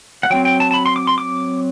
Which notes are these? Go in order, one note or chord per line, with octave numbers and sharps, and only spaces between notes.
F#5
F#3 C4 G5
G5
A5
A5
B5
C6
D6
C6
D6